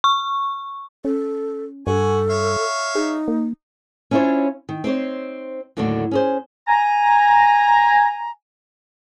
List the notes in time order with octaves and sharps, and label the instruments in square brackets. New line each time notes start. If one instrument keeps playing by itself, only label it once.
[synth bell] C#6
[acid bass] C#4 [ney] A4
[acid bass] G2 [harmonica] F#4 G#5 [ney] A4
[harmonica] C#5 E5 F5
[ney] D#4 [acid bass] G#4
[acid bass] A#3
[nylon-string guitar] C#4 D4 E4 F4 C5 C#5
D#3
C4 D#4 C5 C#5
D#2 A2 D3 F#3 D4 F#4
C#4 G#4 C5
[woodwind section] G#5 A#5